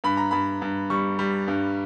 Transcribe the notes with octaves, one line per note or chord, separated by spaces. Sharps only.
G2 B5
A#5
G2 B5
G2
G3 C#6
G3
G2